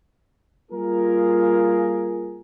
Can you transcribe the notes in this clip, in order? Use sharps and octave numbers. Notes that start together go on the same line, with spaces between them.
G3 A#3 F4 G#4 A#4